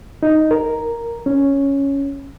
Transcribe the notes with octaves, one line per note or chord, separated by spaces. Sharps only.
D#4
A#4
C#4